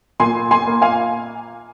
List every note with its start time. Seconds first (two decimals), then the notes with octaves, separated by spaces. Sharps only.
0.20 A#2 G#5 C6
0.51 G#5 C6
0.67 A#3
0.82 F5 G#5